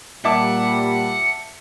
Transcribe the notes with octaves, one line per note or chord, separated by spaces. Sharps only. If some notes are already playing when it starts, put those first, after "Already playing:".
A#2 G3 E5 F#5 A5 D6